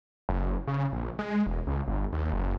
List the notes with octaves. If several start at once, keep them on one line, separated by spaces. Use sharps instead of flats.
F#1
C#3
A#1
G#3
E1
C#2
G1
D#2
F#1